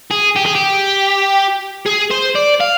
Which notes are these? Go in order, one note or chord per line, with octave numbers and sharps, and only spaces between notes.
G#4
G4
G#4
G4
G#4
C5
D5
F5